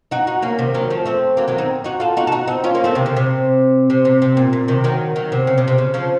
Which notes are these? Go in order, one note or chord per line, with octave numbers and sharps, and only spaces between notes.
D#4 F#4
D#4 F#4
A#3 C#4
C3 D#3
D#3 F#3
F3 A3
A3 C4
F#3 A#3
D#3 F#3
C4 D#4
D#4 F#4
F4 A4
D#4 F#4
A4
D#4 F#4
C4 D#4
C#4 F4
A#3 C#4
A3 C4
C3 D#3
C#3
C3
C3
C3
C3
A#2
A#2
C3 D#3
D#3 F#3
D#3 F#3
C3
C#3
C3
C3
C#3
C#3 F3